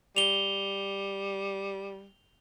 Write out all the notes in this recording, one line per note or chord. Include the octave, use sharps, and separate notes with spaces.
G3 F7 G7